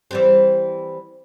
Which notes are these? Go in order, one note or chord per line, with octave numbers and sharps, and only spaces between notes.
E3 G3 C4